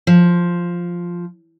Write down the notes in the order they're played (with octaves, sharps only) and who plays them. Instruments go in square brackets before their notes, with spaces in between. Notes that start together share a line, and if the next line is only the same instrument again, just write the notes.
[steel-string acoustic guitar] F3